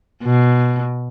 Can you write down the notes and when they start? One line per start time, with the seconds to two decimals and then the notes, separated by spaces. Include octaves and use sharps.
0.23 B2